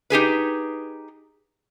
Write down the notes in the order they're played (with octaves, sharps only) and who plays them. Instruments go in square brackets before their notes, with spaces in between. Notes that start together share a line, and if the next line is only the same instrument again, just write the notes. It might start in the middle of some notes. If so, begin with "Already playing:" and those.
[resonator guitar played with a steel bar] D#4 G4 G#4 B4